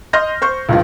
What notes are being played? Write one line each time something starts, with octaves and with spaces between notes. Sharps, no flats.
D#5 C6 F6 G6 A#6
C5 C#6 G6
C#2 G2 F3